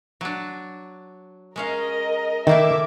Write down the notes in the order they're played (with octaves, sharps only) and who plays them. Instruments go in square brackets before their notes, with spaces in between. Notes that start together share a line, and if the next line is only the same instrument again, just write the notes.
[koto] F#3 D4
[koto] G#3 C#4 F5 [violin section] A#4 D#5
[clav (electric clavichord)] D#3 [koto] A3 A#3 E4 [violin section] E5 D6